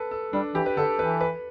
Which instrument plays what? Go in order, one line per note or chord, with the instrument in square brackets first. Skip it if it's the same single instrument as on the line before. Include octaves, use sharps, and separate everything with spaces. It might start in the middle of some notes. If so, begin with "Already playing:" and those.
Already playing: [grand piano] A4 B4
A4
[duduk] G3 [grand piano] D4
[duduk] E3 [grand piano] G4
[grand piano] B4
[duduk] D3 [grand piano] A4
[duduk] E3 [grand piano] B4
[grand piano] B4